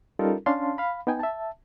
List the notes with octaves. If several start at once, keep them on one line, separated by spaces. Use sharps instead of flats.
G3 C#4 D#4 F4 A4 A#4
C#4 D4 F5 A5 C6
F5 B5
B3 D#4 G5 G#5
E5 A5